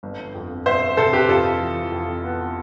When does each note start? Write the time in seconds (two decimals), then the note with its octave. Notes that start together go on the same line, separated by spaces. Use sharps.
0.03 G1
0.34 F2
0.66 G1 C5 E5
0.97 C3 A4 C5
1.13 G4 B4
1.29 F2 F4 A4
1.60 E3
1.92 F2
2.24 B3